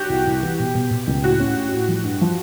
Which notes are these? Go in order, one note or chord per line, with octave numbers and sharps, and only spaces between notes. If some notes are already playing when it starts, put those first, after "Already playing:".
Already playing: F#4 G4
C2
C2
E3
B2
B2
B2
C#2
A2 F#4
C#4
A2
A2
F3
G2
F3